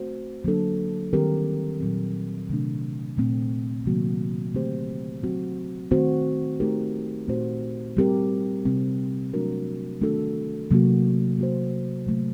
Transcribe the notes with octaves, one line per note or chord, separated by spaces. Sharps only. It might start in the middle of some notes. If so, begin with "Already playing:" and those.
Already playing: A3 C4 F#4 C5
D3 F#3 A#3 D4 A4
D#3 G3 C4 G4 A#4
A#2 F#3 C4
C3 D#3 A3 D4
A#2 A3 C4
C3 D#3 F#3 A#3 F#4
D3 A3 C4 G4 C5
F#3 C4 F#4
D#3 A3 C4 F#4 C5
A3 D#4 G4 A#4
A#2 A3 C4 F#4 C5
G3 C4 G4 A#4
C3 G3 C4
F#3 A3 D4 F#4 A#4
D#3 A3 D4 F#4 A4
C3 F#3 A#3 F#4
A#3 F#4 C5
C3 F#3 A3